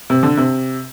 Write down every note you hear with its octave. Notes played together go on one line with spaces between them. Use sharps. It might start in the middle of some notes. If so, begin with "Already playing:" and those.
C3
D3
C3